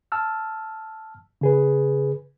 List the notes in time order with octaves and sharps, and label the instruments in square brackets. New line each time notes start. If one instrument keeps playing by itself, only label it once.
[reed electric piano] A5 E6 F6
C#3 G#4 B4